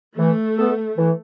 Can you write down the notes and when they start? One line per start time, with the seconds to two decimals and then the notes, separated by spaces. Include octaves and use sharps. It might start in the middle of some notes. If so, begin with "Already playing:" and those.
0.18 E3 A3
0.57 B3 A4
0.97 E3